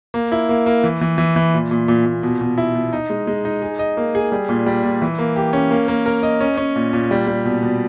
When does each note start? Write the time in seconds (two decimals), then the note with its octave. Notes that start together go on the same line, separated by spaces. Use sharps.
0.14 A#3
0.32 E4
0.49 A#3
0.66 A#3
0.84 E3
1.01 E3
1.18 E3
1.36 E3
1.54 A#2
1.71 A#2
1.88 A#2
2.06 A#2
2.23 B2
2.41 B2
2.58 E4
2.75 B2
2.93 D#4
3.10 G#3
3.27 G#3
3.45 D#4
3.62 G#4
3.79 D#5
3.97 A#3
4.15 G#4
4.32 G3
4.49 A#2
4.66 G3
4.83 A#2
5.02 E3
5.19 A#3
5.36 G4
5.53 C#4
5.71 A#3
5.88 A#3
6.06 A#4
6.23 D#5
6.41 C#4
6.57 C#4
6.76 A#2
6.93 A#2
7.11 G3
7.27 G3
7.45 B2
7.63 B2